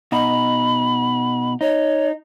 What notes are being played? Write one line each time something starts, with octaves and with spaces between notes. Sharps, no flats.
B2 D#4 B5
D#4 C#5